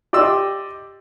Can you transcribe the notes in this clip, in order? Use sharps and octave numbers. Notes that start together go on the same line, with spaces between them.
G4 D5 D#5 C6 E6